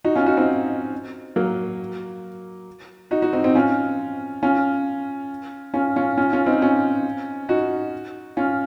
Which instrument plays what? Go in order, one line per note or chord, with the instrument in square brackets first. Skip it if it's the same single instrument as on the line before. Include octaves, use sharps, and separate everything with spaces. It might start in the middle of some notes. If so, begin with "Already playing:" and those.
[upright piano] D#4 F#4
C#4 F4
D#4 F#4
C4 D#4
F#3 A#3
D#4 F#4
D#4 F#4
C4 D#4
C4 D#4
C#4 F4
C#4 F4
C#4 F4
C#4 F4
C#4 F4
C#4 F4
C4 D#4
C#4 F4
D#4 F#4
C#4 F4